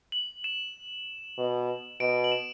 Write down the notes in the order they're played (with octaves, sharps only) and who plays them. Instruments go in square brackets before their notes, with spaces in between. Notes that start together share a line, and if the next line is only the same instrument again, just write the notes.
[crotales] F#7
E7
[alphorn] B2
[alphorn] B2 [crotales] D7
[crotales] F#7
E7